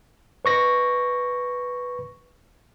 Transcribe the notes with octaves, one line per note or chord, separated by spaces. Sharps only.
B4 C#6 A#6